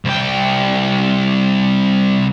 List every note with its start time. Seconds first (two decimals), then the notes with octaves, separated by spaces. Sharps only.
0.05 C2 G5